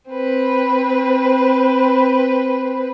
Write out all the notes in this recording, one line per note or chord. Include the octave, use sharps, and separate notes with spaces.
C4 B4